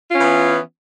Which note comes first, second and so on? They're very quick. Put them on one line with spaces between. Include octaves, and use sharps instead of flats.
F4 C#4 E3 B3